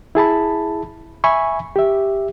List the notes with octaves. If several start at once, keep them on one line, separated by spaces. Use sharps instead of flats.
E4 G#4 A5 B5
E5 G#5 B5 C#6
G4 E5